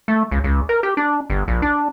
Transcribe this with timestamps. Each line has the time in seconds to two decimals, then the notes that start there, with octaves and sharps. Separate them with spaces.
0.08 A3
0.31 C#2
0.44 C#2
0.69 A#4
0.83 G4
0.97 D4
1.30 G1
1.48 A#1
1.62 D4